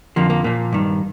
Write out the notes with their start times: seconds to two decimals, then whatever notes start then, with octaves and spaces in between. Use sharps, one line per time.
0.16 F2 D3 F3 A#3
0.30 A#3
0.44 A#2 F3 A#3
0.73 G2 D#3